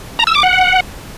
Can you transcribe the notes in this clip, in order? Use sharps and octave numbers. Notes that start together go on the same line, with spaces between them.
A#5
E6
D6
F#5